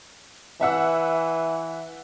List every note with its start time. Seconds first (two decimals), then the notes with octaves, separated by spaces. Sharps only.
0.61 E3 E5 F#5 E6